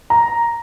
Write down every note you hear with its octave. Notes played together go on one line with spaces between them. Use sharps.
A#5